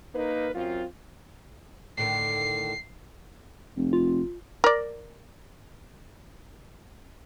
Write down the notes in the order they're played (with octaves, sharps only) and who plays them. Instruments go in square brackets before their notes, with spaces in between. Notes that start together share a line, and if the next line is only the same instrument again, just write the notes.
[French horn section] A#3 D#4 A#4 B4
F#2 C4 F4
[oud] A2 D3 D#3 [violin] C7
[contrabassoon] F1
[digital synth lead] F4
[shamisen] A#4 D5